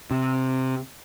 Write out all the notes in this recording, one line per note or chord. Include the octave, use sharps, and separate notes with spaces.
C3